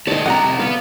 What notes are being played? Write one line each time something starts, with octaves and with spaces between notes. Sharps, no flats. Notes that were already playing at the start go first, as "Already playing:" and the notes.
A3 D4 G4 D5 D#5
F2 C3 G3 F#5 G5 A#5
B3 F5